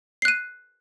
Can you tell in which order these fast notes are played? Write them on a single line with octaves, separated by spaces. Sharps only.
C7 F#6 D#7